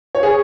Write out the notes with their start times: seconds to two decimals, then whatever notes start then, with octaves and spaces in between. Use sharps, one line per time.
0.15 C#5
0.23 G#4